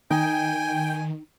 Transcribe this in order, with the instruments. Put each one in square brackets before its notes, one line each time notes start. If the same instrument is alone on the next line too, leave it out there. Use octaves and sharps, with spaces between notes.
[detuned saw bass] D#3 [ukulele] D#4 [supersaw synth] G5 [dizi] G#5